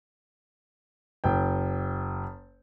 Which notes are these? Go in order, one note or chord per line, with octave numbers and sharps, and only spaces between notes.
F#1 G5